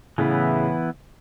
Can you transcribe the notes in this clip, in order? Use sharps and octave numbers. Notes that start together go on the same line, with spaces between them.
A2 C#3 E3 B3 E4